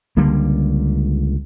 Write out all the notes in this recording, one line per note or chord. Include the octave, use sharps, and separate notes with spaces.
C#2 D3 G3 A#3